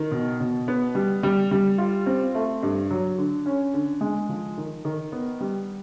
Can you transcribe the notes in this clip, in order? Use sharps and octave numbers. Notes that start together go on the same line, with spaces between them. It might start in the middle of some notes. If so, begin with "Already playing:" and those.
Already playing: D#3
B2
B2
B3
G3
G3
G3
F4
C4
A3
G2
F#3
D3
C#4
D3
G#3
F3
D#3
D#3
B3
G3